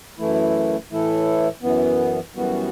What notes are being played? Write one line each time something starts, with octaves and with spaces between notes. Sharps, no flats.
F#2 E3 A3 E4
A2 E3 A3 E4 A4
F#2 E3 B3
F#2 E3 G3 B3 F#4